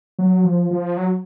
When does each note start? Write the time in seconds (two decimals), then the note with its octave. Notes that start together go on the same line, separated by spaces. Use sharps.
0.19 F#3
0.45 F3
0.71 F3
0.97 F#3